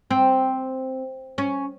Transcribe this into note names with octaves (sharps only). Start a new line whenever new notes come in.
C4
C#4